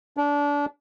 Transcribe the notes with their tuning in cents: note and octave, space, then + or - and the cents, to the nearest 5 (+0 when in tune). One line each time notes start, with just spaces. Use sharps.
D4 -25